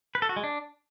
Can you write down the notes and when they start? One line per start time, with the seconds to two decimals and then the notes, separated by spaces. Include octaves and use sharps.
0.15 B4
0.22 A4
0.29 F#4
0.36 G#3
0.44 D4